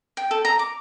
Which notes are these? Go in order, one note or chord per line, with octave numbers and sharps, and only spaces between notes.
G5
A4
A#5
D6